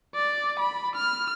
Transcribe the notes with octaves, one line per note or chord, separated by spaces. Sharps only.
D5
B5
F6